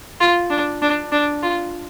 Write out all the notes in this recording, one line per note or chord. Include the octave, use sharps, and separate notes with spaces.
F4
D4
D4
D4
F4